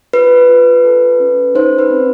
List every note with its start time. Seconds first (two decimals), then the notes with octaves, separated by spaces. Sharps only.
0.13 F4 B4
0.49 F4
0.84 A4
1.20 C#4
1.55 D#4 C5
1.78 B4
1.91 C4